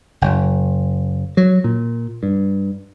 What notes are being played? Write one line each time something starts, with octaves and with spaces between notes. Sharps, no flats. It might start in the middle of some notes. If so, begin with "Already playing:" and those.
F#1
F#3
A#2
G2